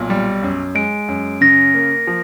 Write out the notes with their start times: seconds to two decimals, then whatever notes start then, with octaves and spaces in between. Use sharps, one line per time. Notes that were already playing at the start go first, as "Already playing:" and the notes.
Already playing: B1 A#2
0.10 G3
0.43 F#2
0.75 G#3 D7
1.08 F#2
1.41 C#3 A#6
1.74 A#3
2.07 F3